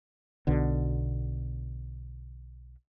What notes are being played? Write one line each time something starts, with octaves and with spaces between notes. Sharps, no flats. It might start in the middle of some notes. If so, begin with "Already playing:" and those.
B1 B2 D3